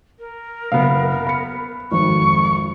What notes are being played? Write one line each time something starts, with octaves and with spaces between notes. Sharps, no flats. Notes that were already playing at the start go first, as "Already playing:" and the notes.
A#4
F#1 B3 F5
B5 C#7
G#1 F2 C#6